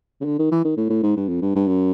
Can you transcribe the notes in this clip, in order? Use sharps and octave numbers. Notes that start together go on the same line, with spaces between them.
C#3
D3
D#3
E3
D#3
A2
A2
G#2
G2
F2
G2
G2
F#2